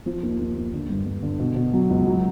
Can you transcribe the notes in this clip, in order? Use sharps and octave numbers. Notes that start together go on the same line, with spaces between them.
F3
D#2
D#2
D#2
D3
G2
G2
D3
B2
B2
F#3
C#2
F#3